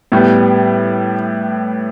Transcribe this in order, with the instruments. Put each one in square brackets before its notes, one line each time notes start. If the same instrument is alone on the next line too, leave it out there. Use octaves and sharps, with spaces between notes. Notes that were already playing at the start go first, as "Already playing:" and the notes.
[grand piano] A2 G3 B3